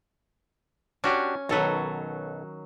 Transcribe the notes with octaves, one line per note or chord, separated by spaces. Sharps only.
C#4 D4 F#4 G4
B1 D#3 F#3 A4 B4